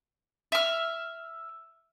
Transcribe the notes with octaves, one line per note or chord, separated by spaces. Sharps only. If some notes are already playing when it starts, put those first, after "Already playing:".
E5 F6